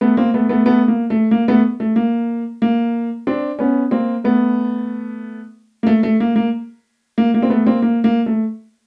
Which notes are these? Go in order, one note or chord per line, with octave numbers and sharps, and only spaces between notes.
A3 B3
A#3 C4
A3 B3
A3 B3
A3 B3
A#3
A3
A#3
A3 B3
A3
A#3
A#3
C4 D4
B3 C#4
A#3 C4
A3 B3
A#3
A3
A3
A#3
A#3
A#3
A#3
C4
A3 B3
A#3 C4
A#3
A#3
A3